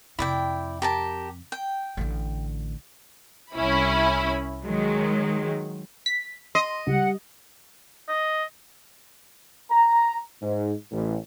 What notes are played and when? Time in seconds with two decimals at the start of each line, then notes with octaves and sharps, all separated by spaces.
0.19 F2 C3 E4 D5 G5
0.82 G4 A#4 A5
1.52 G5
1.97 A1 D3
3.54 C2 C#4 E4 B5
4.63 D#3 F#3 G#3
6.06 B6
6.55 D#5 C6
6.87 C#2 G3 F#5
8.09 D#5
9.70 A#5
10.42 G#2
10.91 A1